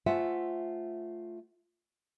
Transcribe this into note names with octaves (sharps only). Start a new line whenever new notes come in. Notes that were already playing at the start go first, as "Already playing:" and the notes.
A3 F4 C5 E5 F#5 G#5